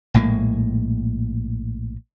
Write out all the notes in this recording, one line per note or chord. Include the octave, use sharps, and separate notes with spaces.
A#1 A2 G#3 A#3